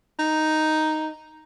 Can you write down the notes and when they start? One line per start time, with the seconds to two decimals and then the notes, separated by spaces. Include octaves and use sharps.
0.19 D#4